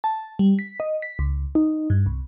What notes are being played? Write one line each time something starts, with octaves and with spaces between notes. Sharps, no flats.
A5
G3
B6
D#5
B6
C#2
D#4
G2
C2